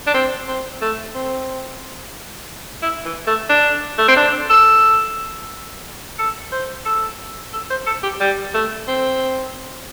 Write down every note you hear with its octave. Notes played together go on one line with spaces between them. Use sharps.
D4
C4
C4
A3
C4
E4
E3
A3
D4
A3
C4
D4
A4
A4
C5
A4
A4
C5
A4
G4
G3
A3
C4